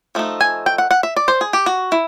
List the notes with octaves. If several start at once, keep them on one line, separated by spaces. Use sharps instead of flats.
F3 A3 D#4
G#5
G5
F#5
F#5
E5
D5
C5
G#4
G4
F#4
E4